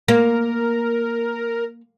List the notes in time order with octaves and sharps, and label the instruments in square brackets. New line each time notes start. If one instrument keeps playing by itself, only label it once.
[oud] A#3 [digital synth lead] A#4